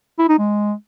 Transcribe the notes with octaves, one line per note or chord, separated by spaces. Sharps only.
E4
D#4
G#3